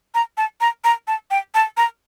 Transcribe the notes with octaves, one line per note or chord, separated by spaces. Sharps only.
A#5
A5
A#5
A#5
A5
G5
A5
A#5